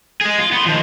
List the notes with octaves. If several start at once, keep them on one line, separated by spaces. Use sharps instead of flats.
G#3 G#4
F4
B3 C6
D#3 F3